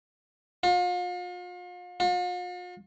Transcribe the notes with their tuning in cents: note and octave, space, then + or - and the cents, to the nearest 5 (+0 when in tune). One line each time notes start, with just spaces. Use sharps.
F4 +40
F4 +45